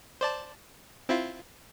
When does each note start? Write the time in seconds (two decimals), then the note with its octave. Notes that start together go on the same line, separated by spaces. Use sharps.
0.21 C5 D5 A5
1.09 C4 E4 F4